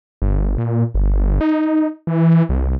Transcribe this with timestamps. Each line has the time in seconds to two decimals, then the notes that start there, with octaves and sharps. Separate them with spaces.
0.22 G1
0.58 A#2
0.95 G1
1.41 D#4
2.07 E3
2.49 C2